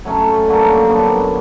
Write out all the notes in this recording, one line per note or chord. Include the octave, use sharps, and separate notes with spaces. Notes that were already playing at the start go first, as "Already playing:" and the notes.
F#3 A3 C#4
G2 D3 F#3 A#3
A#2 F#3 B3 D4